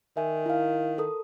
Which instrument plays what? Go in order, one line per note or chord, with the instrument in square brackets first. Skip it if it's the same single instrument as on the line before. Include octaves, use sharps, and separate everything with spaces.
[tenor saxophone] D#3 [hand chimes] E5 G#5
[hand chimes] E4 F5
A4 A#4 D#6